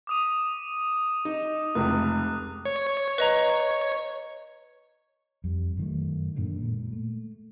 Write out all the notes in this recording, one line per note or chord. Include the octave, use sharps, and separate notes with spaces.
D6 D#6 D#7
D#4
F1 C#2 F#6
C#5
B4 D#5 A#5
F2 G3
F#2 D#3 A3
F#2 A#2 D3 D#3
A#2 G#3
A3